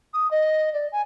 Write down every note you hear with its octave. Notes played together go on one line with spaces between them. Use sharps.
D#6
D#5
D5
G#5